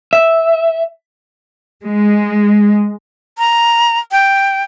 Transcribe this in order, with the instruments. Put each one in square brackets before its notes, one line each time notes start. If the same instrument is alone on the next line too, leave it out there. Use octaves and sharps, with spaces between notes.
[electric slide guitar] E5
[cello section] G#3
[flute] A#5
G5